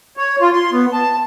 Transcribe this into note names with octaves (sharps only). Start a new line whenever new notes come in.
C#5
F4
C6
B3
A5